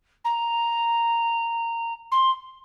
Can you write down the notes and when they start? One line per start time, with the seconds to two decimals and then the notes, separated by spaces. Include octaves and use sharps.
0.24 A#5
2.11 C6